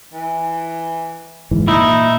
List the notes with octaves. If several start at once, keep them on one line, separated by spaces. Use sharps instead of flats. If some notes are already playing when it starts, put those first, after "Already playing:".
E3
F#1 G#2 E3
A#2 D#4 E4